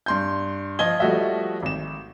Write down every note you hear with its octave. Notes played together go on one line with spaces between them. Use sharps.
G2 C6 G6
F3 F4 D#5 G#6 G7
F3 G3 A3 F#4 D#5 E5
G#1 E7